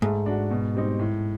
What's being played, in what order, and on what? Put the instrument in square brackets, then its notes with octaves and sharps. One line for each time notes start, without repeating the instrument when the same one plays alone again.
[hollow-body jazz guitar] G#2 [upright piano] A3
[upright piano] D4 F#4
B2
G3 C4 D#4
A2